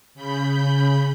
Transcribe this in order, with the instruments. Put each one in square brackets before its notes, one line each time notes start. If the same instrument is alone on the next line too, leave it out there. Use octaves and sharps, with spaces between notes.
[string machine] C#3 B5 G6